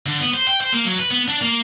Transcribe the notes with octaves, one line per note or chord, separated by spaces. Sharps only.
D3
B3
C5
G5
C5
A#3
F#3
B4
B3
D4
A#3